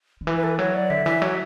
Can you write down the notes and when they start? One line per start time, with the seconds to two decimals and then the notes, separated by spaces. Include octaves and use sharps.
0.21 D3
0.27 E3 B4
0.37 B4
0.44 A4
0.48 B4
0.59 F#3 C#5
0.75 D5
0.90 D3 E5
1.06 E3 E5
1.22 F#3 C#5